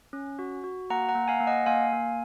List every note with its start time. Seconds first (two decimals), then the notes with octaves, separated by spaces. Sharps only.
0.13 C#4
0.39 F#4
0.64 F#4
0.90 A#3 F#5 A#5
1.09 F#5 A#5
1.15 A#3
1.28 F5 G#5
1.40 A#3
1.47 D#5 F#5
1.66 A#3 F5 G#5
1.93 A#3